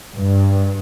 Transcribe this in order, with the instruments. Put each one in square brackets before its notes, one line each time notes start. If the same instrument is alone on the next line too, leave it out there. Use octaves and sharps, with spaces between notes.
[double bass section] G2